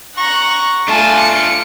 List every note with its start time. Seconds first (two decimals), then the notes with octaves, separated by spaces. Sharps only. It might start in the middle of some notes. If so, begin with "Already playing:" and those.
0.17 F#5 A#5 C#6
0.50 C#6
0.88 A3 D4 F4 G#5 A5
1.19 C#7